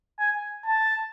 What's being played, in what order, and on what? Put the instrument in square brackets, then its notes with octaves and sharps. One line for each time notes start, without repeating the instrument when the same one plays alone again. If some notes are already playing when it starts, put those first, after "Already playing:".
[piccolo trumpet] G#5
A5